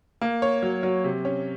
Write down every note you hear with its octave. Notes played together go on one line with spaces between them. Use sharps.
A#3
C#5
F#3
F#3
C3
C#4